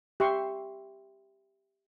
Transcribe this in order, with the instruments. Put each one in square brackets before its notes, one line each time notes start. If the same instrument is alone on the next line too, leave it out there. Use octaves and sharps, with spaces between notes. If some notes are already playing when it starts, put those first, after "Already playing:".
[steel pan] G4 E5 C6 C#6